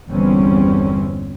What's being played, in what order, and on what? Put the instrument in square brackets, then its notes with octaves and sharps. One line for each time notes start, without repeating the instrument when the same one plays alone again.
[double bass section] G1 E2 D3 G3 C4 C#4